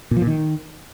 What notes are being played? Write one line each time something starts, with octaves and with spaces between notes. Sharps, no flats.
A#2
F3
A#2
D#3